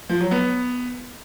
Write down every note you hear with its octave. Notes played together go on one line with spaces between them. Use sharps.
F3
F#3
B3